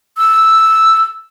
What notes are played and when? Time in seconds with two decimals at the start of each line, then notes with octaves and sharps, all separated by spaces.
0.18 E6